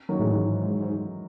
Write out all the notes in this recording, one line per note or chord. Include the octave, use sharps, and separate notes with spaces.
D#3 F#3
A2 E3 G#3
G#2 E3 G#3